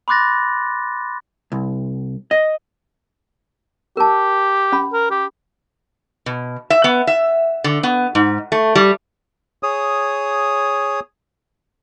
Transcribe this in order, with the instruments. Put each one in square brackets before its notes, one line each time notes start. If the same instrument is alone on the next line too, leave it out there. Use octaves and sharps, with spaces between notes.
[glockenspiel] B5 C6 D6 F#6 A6 A#6
[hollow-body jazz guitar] C2
D#5
[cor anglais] G4 [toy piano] A#4 A5
[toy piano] C#4 B5
[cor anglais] A#4
G4
[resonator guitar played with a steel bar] B2
E5
B3
E5
D3
B3
G#2
A3
G3
[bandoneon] G#4 C#5 D#6